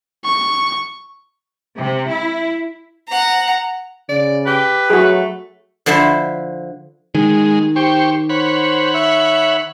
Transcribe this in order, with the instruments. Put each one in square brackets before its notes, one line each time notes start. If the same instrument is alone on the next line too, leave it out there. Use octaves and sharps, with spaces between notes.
[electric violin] C#6
[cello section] C3
E4
[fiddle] F#5 A#5
[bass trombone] C#3 [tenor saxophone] D5
[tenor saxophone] G4 [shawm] B4
[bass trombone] F#3 [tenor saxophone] A3 [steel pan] F#4 G#4
[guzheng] D3 F3 E4 C5 E5
[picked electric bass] D#3 [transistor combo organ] G#3
[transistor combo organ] G4 C5 C#6 [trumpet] G5
[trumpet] C5 [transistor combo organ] C#5 F#5 B5
[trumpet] E5